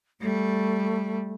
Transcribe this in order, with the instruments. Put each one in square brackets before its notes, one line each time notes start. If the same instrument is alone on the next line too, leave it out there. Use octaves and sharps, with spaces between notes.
[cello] G3 [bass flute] A3